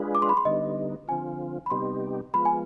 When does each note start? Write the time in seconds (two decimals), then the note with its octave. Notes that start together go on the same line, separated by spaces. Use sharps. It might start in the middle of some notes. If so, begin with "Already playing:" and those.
Already playing: G#3 D4 F4 G#4 B4
0.15 D6
0.22 C6
0.29 B5
0.37 C6
0.45 D3 G3 B3 D#4 D#5
1.08 D3 F3 C4 F4 G#5
1.66 B5
1.70 C3 G3 B3 D#4 G4 C6
2.34 F3 G#3 B3 F4 B5
2.45 G#5